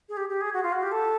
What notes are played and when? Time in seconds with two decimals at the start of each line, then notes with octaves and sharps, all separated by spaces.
0.09 G#4
0.17 G4
0.29 G4
0.41 G#4
0.54 F#4
0.63 F4
0.72 F#4
0.83 G4
0.92 A4